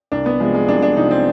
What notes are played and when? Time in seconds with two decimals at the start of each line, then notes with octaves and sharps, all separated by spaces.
0.12 C2 D4
0.26 B3
0.40 C3 F3 G#3
0.55 G#3
0.68 C2 D4
0.82 D4
0.96 C3 F3 D#4
1.11 C4